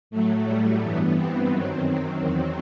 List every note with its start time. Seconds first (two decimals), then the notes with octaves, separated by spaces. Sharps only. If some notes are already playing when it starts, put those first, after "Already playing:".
0.11 A2 F#3 A3
0.46 G3
0.81 G2 E3 B3
1.16 C4
1.51 F#2 D#3 F#3 C4
2.21 E2 D#3 F#3